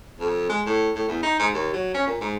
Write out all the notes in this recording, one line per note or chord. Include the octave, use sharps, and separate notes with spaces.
F2
G#3
A2
A2
E2
D#4
G#2
D#2
F#3
C#4
A#2
G#2